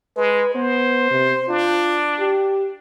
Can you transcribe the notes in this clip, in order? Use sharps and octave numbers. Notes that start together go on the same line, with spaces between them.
G#3 B4
B3 C5
C3
D4 F4
G4